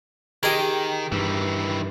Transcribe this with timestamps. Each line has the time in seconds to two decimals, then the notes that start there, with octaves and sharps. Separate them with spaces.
0.43 D#3 G4 G#4 A#4 D#5
1.12 G2 D#3 E3